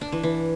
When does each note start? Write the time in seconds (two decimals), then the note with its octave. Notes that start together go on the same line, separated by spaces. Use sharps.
0.01 D4
0.12 E3
0.23 E3